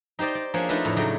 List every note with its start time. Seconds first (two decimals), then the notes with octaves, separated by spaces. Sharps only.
0.19 D#4 G4 C5 D5 D#5
0.35 D5
0.54 F3 A#3 C#4 D4 G#4 C#5
0.69 A3 D4 D#4 F4 B4 D#5
0.84 F2 A2 A#5
0.97 C#3 F#3 A3 D#4 D5